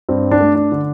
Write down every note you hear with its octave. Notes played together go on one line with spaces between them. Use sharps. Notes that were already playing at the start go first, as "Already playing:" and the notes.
G2 C4
D4
A3
D4
D3